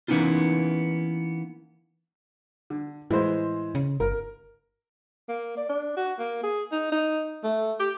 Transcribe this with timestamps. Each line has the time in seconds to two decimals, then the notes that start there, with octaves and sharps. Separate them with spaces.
0.08 E3 A#3 B3 C#4 D#4 F4
2.70 D3
3.11 A2 E3 G#3 C5
3.75 C#3
4.00 G1 A#4
5.29 A#3
5.57 D5
5.69 D4
5.97 F#4
6.19 A#3
6.44 G#4
6.72 D#4
6.92 D#4
7.44 A3
7.80 G4